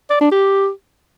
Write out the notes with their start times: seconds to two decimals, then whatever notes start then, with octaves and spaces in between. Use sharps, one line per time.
0.10 D5
0.21 D4
0.31 G4